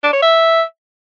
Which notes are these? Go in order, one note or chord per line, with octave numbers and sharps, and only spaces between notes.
D4
C#5
E5